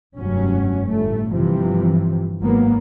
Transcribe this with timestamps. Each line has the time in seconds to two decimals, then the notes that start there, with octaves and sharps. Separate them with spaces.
0.16 F1 G2 F#3 C#4
0.87 G1 A2 A3
1.31 G1 G2 C3 E3 F3
2.40 G#1 G#2 F#3 A#3 B3